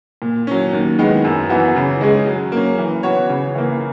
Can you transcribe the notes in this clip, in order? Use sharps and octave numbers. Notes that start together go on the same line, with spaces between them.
A#2
F#3 C#4
D#2
D#3 G#3 B3
F#2
E3 B3 F#4
C#3
G#3 C#4 G#4
F#3
A#3 C#4
E3
B3 F#4 C#5
C#3
E3 A#3